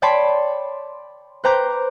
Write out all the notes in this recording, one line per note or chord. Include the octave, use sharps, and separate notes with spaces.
C#5 D5 G5 A5 B5 C6
B4 C5 G5 A#5 D6 G6